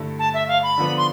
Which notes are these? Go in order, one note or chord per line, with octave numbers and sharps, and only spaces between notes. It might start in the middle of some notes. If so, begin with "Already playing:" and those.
Already playing: G2 D3 A3 E4
A5
E5
F5
B5
D3 F3 B3 D4
C6